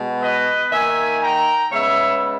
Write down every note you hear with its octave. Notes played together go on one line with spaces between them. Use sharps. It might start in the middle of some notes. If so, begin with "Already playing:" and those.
Already playing: B2 G#3 B3
B4 D#5
D#3 A#3 D#4 E5 G#5
G5 A#5
C#3 G#3 B3 C#5 E5